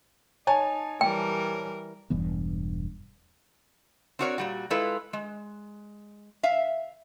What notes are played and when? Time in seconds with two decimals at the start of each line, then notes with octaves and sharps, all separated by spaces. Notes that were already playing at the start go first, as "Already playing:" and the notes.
0.47 D#4 C#5 G#5 A5
1.01 E3 G3 A#4 G5
2.10 E1 G2 E3 B3
4.19 C4 D4 F#4 A#4 C#5 D5
4.38 A#2 G3 F#4
4.70 G#3 E4 F4 A4 B4
5.13 G#3
6.43 E5 F5